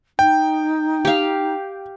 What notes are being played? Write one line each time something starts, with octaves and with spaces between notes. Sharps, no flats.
D#4 G5
G4 F5